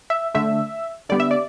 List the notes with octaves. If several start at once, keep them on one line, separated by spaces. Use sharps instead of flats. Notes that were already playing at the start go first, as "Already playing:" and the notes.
E5
D3 A3 E5
D3 G3 B3 D5
E5
D5